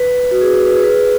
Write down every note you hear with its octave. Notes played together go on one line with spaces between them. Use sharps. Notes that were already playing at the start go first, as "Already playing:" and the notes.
Already playing: B4
F#4
G#4
B4
B4
G#4
B4